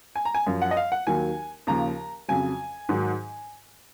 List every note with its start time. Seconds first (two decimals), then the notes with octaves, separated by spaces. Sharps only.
0.16 G#5
0.25 A#5
0.34 G#5
0.47 F#2 F3
0.62 F#5
0.71 D#5
0.77 F5
0.92 F#5
1.07 D#2 D#3 F#3 G#5
1.67 D#2 C#3 F3 A#5
2.28 F2 C#3 F#3 G#5
2.89 G#2 D#3 F#3